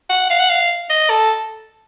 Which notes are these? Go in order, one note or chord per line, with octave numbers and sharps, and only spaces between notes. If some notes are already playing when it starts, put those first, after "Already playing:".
F#5
F5
F#5
F5
D#5
A4